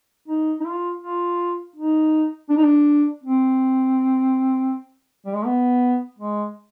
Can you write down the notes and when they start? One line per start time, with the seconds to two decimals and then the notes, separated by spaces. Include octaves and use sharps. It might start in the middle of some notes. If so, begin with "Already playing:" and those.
0.28 D#4
0.60 D#4
0.65 F4
1.02 F4
1.76 D#4
2.49 D4
2.57 D#4
2.64 D4
3.24 C4
5.26 G3
5.35 G#3
5.46 B3
6.19 G#3